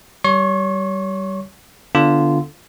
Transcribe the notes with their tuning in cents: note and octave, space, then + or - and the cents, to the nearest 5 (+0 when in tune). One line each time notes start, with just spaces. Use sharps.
G3 -20 C#5 +25 C#6 -45
D3 +0 B3 +0 F4 -15